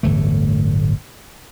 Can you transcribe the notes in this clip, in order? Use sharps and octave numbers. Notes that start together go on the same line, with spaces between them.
D1 G1 E3 A3